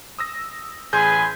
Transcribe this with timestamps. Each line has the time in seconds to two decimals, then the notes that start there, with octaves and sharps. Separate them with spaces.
0.19 D#6 E6 A#6
0.93 A1 G#4 B4 G#5 C6 G6